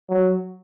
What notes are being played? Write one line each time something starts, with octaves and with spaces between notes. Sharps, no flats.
F#3